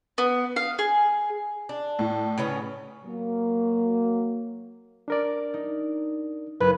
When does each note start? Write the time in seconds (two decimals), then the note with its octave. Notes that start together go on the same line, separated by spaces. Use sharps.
0.18 B3
0.56 F5
0.79 G#4
1.69 D4
1.99 A2
2.38 C#3 B3 C#4
3.04 F#3 A#3
5.08 D4 A#4 D5
5.54 D#4
6.61 F#1 B4